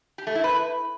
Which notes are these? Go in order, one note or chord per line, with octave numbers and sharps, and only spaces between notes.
G4
A3
E4
B4